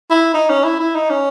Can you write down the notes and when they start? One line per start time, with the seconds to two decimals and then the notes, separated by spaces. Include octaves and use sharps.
0.10 E4
0.34 D#4
0.49 C#4
0.64 E4
0.80 E4
0.95 D#4
1.10 C#4